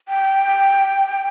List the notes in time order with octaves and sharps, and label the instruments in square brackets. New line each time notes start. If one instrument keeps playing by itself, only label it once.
[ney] G5